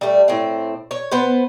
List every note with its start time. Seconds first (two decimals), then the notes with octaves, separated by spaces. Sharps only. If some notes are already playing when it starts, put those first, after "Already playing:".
0.01 G3 A3
0.28 A2 C4
0.91 C#5
1.11 B3 B4 C5